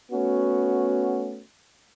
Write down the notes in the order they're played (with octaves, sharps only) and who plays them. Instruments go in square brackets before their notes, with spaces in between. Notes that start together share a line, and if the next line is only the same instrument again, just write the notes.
[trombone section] A3 B3 C#4 F#4